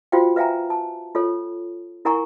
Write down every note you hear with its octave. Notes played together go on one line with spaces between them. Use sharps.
F4 F#4 C5 F5 G5
B4 E5 F5 G5 G#5 A#5
A5
F4 A4 C#5
E4 A#4 F#5 G#5 A#5 C#6